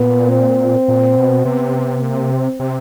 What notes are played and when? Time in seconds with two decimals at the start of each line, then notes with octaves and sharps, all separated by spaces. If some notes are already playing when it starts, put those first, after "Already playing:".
Already playing: A#2 B3
0.30 C4
0.88 A#2
1.17 B2
1.45 C3 B3
2.02 A#3
2.31 C4
2.60 C3